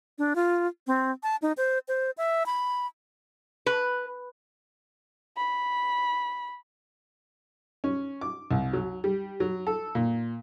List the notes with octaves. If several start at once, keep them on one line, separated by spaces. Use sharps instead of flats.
D4
F4
C4
A5
D#4
C5
C5
E5
B5
B4
B5
C#4
D6
C2
F#3
G3
F#3
A4
A#2